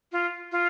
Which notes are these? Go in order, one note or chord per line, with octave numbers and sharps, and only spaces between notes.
F4
F4